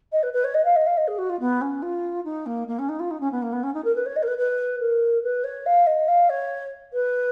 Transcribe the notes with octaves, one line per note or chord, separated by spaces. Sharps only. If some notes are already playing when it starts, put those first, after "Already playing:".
D#5
B4
B4
C#5
D#5
F5
D#5
F5
D#5
G#4
F#4
F4
B3
C#4
F4
D#4
A#3
A#3
C#4
D#4
F4
D#4
C#4
B3
A#3
B3
C#4
D#4
A#4
B4
C#5
D#5
A#4
B4
B4
A#4
B4
C#5
F5
D#5
F5
C#5
B4